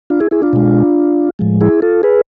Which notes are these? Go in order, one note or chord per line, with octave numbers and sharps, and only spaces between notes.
D4 F4
E4 G#4
E4 G#4
D4 F4
B2 G#3
A2 F3 G#3
E4 G#4
F4 A4
G#4 B4